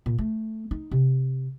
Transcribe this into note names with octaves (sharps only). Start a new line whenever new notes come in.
A#2
A3
D#4
C3